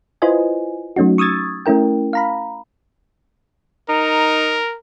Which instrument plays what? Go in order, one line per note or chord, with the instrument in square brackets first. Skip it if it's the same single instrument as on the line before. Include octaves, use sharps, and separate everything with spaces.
[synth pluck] E4 F4 B4 C5 D#5 G#5
F#3 A3 C#4 D#4 F#4
C#6 D#6 E6 G#6 A6
A3 C#4 E4 A#4 G5
F5 A#5 B5
[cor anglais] D#4 [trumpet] A#4